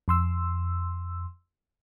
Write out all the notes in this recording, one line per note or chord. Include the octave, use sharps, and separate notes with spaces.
F2 C6 E6